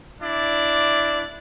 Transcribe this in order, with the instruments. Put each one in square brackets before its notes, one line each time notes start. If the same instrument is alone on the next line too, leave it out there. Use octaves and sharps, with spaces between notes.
[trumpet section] D4 E4 D5